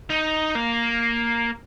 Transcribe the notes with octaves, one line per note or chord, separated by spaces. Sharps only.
D#4
A#3